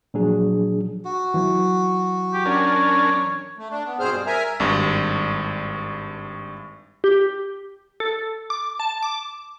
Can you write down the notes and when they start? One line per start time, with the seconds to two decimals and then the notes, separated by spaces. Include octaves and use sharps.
0.14 A#2 F3 F#3 D4 G#4
1.05 F#4
1.34 E3 F#3
2.33 G4
2.45 C#4 D4 A#4 C#5
3.58 A3
3.71 D4
3.86 B3
4.00 G2 B2 C4 G#4 C5 F6
4.14 G3
4.27 A#4 E5 G#5 A#5
4.60 G#1 G2
7.04 G4
8.00 A4
8.50 D6
8.80 A5
9.02 D6